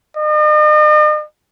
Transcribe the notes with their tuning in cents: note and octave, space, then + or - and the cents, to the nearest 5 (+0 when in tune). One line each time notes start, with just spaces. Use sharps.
D#5 -45